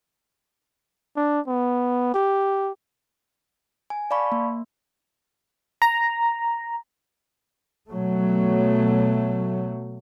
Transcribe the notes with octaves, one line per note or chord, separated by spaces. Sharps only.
D4
B3
G4
G#5
D5 F5 A5 B5 C#6
A#3
A#5
B2 F#3 A3